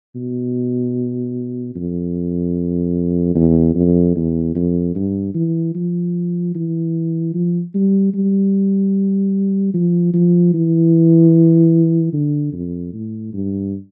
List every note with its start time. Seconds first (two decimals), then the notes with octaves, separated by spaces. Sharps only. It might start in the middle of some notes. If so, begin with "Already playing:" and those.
0.15 B2
1.75 F2
3.35 E2
3.75 F2
4.15 E2
4.55 F2
4.95 G2
5.34 E3
5.75 F3
6.55 E3
7.34 F3
7.75 G3
8.14 G3
9.74 F3
10.14 F3
10.54 E3
12.13 D3
12.53 F2
12.93 A2
13.33 G2